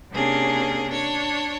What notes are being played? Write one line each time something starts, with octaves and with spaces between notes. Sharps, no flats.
C3 A#3 C#4 D4 G#4
D4 C#5